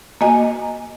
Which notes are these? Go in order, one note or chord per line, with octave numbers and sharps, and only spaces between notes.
A#3 F#4 D#5 G#5